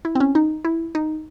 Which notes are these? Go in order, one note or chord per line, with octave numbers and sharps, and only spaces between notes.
E4
C4
C#4
D#4
E4
D#4